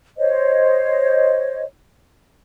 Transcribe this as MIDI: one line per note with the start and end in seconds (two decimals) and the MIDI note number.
0.17 1.64 72
0.17 1.64 73
0.17 1.64 75